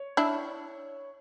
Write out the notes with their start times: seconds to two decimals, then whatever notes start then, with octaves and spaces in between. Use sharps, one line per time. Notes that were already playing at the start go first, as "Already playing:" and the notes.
Already playing: C#5
0.17 D4 E4